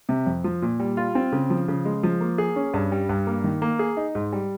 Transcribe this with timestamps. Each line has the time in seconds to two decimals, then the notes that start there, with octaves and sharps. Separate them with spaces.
0.09 C3
0.27 F2
0.44 F3
0.62 A#2
0.80 G3
0.97 F4
1.15 C4
1.32 C#3
1.50 F3
1.68 C#3
1.85 G#3
2.03 F3
2.21 A#3
2.38 G#4
2.56 C#4
2.74 G2
2.92 G3
3.09 G2
3.27 A#3
3.44 D#3
3.62 A#3
3.79 G#4
3.97 D#4
4.15 G#2
4.33 G3